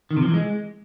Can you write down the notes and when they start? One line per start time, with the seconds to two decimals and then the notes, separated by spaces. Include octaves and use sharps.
0.11 D#3
0.16 C3
0.22 F3
0.28 E3
0.34 G#3